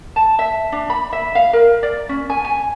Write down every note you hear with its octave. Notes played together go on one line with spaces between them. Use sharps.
A5
E5
D4
B5
E5
F5
A#4
D5
C#4
G#5
G#5